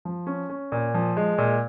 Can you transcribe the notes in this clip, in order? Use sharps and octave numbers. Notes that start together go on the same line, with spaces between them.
F3
C#4
C#4
A#2
F3
G#3
A#2